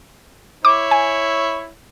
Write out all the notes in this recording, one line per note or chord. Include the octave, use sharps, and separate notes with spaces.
E4 C#5 D6
G#5